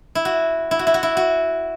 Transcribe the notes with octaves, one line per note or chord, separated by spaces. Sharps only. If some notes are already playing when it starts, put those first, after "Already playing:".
E4
F#4
E4
F#4
E4
F#4
E4
F#4